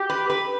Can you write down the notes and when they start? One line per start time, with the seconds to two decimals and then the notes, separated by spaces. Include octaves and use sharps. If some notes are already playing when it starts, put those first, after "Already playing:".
Already playing: G4
0.10 B4
0.30 B4